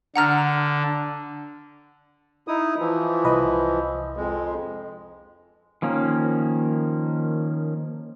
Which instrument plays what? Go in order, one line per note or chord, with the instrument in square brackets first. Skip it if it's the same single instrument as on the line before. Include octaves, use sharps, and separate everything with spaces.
[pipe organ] D3 [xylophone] F#5 A#5 F6
[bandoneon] D#4 E4 D#6
E3 F3
[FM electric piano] C2 B4 D#5
[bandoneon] F2 G#3
[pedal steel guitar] D#3 F3 A#3 C#4